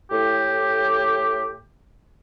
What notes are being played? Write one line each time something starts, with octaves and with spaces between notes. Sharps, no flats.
A2 G4